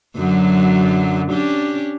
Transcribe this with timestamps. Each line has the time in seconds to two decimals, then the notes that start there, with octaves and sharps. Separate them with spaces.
0.16 F#2 D3 F#3
1.32 C#4 D4 G4